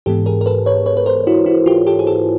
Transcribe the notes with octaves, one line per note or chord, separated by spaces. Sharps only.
G#2 E3 G#3 B3 G4 A4
G#4 A#4
A#4
A4 B4
B4 C#5
B4 C#5
B4
A#4 C5
E4 F#4
E4 F#4
F4 G4
G4 A4
G#4
G4 A4